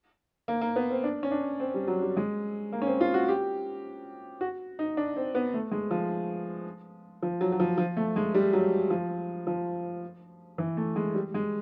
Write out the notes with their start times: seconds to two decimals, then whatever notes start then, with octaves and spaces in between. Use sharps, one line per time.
0.48 A#3
0.61 A#3
0.76 B3
0.91 C4
1.04 D4
1.23 C#4
1.31 D4
1.60 C4
1.74 G3
1.88 F#3
2.02 G3
2.17 G#3
2.72 A#3
2.82 C#4
2.87 C4
3.01 F4
3.14 F#4
3.28 G4
4.41 F#4
4.79 D#4
4.97 D4
5.16 C4
5.35 B3
5.54 A3
5.71 G#3
5.91 F3
7.22 F3
7.41 F#3
7.52 F#3
7.60 F3
7.78 F3
7.97 A3
8.16 G#3
8.35 G3
8.53 F#3
8.90 F3
9.47 F3
10.58 E3
10.77 A3
10.96 G#3
11.15 G3
11.34 G#3